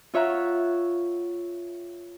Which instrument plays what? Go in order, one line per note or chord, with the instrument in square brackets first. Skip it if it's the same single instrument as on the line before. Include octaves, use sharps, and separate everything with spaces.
[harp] F4 C#5 E5 F#5 A#5